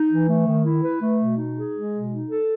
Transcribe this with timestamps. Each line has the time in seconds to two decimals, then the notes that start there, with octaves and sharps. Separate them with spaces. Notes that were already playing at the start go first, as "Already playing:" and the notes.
Already playing: D#4
0.10 E3
0.28 A3
0.46 D#3
0.65 E4
0.83 B4
1.01 A3
1.19 B2
1.37 D#4
1.56 G#4
1.74 G#3
1.92 B2
2.10 D#4
2.29 A4